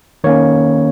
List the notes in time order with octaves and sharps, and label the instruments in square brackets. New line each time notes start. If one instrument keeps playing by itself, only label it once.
[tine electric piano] D#3 A#3 C#4 C#5